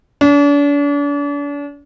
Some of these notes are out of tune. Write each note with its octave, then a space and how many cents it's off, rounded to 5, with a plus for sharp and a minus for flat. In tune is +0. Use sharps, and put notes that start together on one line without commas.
D4 -40